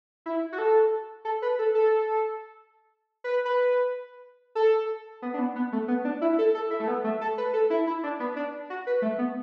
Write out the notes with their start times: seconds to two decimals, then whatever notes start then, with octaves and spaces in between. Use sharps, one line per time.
0.26 E4
0.52 F#4
0.58 A4
1.25 A4
1.42 B4
1.59 A4
1.75 A4
3.24 B4
3.45 B4
4.55 A4
5.22 B3
5.34 D4
5.39 B3
5.56 B3
5.72 A3
5.88 B3
6.05 D4
6.21 E4
6.38 A4
6.54 A4
6.70 E4
6.80 A3
6.88 B3
7.04 A3
7.21 A4
7.38 B4
7.53 A4
7.70 E4
7.87 E4
8.03 D4
8.20 B3
8.36 D4
8.70 F#4
8.87 B4
9.02 A3
9.19 B3